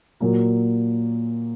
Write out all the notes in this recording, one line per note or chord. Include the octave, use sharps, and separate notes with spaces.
A#2 F#3 A#3